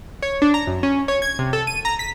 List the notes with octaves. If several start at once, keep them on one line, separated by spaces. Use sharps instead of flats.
C#5
D4
A#5
F#2
C#4
C#5
G#6
C3
A4
D#7
A#5
B6